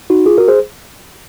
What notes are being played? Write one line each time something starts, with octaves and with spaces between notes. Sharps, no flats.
D#4 F#4
F4 G#4
F#4 A#4
G#4 C5